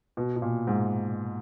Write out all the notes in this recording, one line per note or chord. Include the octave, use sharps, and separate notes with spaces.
B2
B2
A#2
G#2